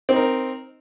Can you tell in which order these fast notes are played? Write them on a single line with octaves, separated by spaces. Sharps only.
C4 D#4 A#4